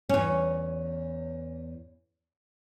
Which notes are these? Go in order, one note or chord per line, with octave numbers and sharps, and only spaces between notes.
E2 C#4